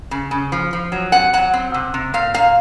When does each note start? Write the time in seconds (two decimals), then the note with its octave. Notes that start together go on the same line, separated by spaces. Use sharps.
0.11 C#3
0.31 C#3
0.52 F3
0.73 F3
0.92 F#3
1.12 C3 F#5
1.33 F#3 F#5
1.53 C4
1.74 C3
1.94 C3
2.14 A#2 F5
2.34 A#3 F5